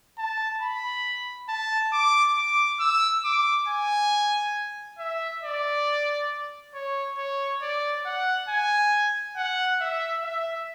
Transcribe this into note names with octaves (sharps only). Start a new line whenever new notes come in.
A5
B5
A5
D6
D6
E6
D6
G#5
E5
D5
C#5
C#5
D5
F#5
G#5
F#5
E5
E5